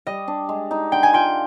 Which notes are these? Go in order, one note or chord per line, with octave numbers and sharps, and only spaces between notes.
G3 D#5
D4
G#3
D#4
D3 G5
G#5
F4 G5